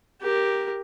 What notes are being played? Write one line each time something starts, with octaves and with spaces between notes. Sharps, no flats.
G4 A#4